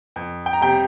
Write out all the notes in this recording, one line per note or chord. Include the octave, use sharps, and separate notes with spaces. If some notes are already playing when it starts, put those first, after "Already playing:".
F2
G5
A#5
C3 G3 G5